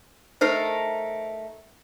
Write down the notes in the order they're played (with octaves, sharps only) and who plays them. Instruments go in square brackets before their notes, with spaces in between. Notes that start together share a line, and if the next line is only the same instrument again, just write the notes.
[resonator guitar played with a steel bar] A3 D#4 A#4 [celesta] C5 F6 C7